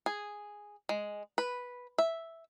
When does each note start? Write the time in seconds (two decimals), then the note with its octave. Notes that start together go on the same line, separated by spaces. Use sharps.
0.06 G#4
0.89 G#3
1.38 B4
1.98 E5